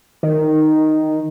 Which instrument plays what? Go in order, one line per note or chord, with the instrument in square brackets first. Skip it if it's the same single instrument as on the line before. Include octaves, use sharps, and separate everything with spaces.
[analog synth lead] D#3